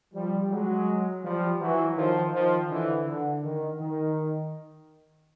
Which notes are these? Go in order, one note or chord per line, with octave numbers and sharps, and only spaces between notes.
F3 G3
F#3 G#3
F3 G3
E3 F#3
D#3 F3
D#3 F3
D3 E3
D3
D#3
D#3